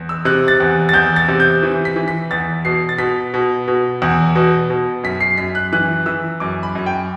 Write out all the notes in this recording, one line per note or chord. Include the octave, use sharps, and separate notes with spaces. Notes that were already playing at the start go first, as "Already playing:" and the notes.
Already playing: E2
E6
C3 F#6
A6
E2
A6
E2 G6
A6
C3
G6
E3
B6
E3
B6
E2 A6
B2 C7
A6
B2 B6
B2
B2
E2
B2
B2
F#2 B6
C7
F#2 B6
F#6
E3 F#6
E3 E6
F#2 D6
B5
F#2
G5